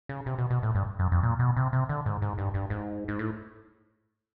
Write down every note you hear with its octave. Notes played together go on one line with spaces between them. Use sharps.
C#3
C3
B2
B2
A2
G2
F#2
F2
A#2
B2
C3
C3
D3
G#2
G#2
G2
G2
G#2
G#2
A2